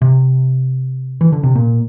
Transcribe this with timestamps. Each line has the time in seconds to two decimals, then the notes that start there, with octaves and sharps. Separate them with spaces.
0.02 C3
1.21 E3
1.32 D3
1.43 C3
1.55 A#2